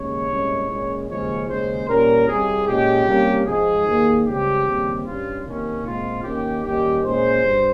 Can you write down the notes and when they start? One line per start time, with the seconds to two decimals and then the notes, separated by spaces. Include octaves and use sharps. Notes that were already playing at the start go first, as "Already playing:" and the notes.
Already playing: D#2 C#3 G#3 C#4 C#5
0.30 C2 A#2 G#3 C#4
0.70 A#2 G#3 C#4
1.09 D#2 C#3 F3 G#3 C#4 C#5
1.48 D#2 C#3 G#3 C#4 C5
1.89 A#2 G3 C#4 A#4
2.28 C2 C3 G3 G#4
2.67 A#2 G#3 C#4 G4
3.07 C3 G3 A#3 C#4
3.47 G#2 F3 G#3 G#4
3.86 D#2 D#3 A#3
4.26 C#2 C#3 G3 C4 G4
4.66 D#2 C#3 G3 C4
5.05 G2 G3 C#4 F4
5.44 C3 D#3 A#3 C#4
5.84 A#2 G#3 C4 F4
6.24 D#2 D#3 A#3 C#4 G4
6.63 D#2 D#3 G3 C#4 G4
7.03 A#2 G#3 C#4 C5
7.43 G2